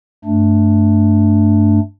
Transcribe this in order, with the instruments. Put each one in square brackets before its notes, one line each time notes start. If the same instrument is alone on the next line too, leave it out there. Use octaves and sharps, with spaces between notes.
[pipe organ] G2 A3 D4